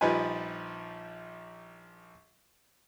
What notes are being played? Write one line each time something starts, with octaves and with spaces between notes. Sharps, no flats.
A#1 F3 G3 D#4 B4 G#5